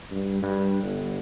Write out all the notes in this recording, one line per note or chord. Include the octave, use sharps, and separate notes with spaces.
G2
G2
G1